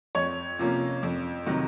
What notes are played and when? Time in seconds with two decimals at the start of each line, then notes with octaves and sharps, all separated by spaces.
0.15 F2 C#5
0.59 C3 F3 A#3 C#4
1.03 F2
1.46 C3 D#3 F#3